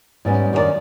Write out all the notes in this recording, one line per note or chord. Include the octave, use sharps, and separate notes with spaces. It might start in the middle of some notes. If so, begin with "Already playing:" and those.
G#2 G3 B3 C#4
F#2 D#3 G4 A#4 D5